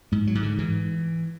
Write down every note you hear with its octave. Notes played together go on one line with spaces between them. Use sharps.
G#2 G#3
F#3
G#2
D3
G#2 E3